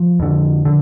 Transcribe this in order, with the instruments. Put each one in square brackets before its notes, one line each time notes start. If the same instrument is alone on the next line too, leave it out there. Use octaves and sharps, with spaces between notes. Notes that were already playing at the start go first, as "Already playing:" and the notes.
Already playing: [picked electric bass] F3
F2 D3
D3